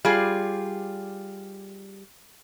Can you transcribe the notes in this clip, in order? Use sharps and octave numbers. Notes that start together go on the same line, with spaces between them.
G3 F4 G#4